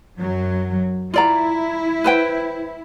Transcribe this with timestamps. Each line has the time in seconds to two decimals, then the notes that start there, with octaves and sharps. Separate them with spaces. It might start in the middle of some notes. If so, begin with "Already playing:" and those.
0.17 F#2 F#3
1.14 E4 F4 D5 A#5
2.04 B4 C5 G5